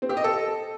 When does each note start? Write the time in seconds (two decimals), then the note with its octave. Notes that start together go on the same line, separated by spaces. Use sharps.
0.02 C4
0.09 G4
0.17 D#5
0.24 A4